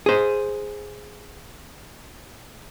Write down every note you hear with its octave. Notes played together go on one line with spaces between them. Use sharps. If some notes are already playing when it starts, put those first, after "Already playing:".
G#4 C5